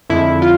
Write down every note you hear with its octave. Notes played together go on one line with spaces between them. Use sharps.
F2 D3 F3 G#3 E4
F4